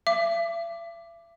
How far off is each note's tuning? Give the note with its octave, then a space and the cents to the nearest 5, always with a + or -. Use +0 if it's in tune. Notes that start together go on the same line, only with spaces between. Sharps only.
E5 +40 D6 +5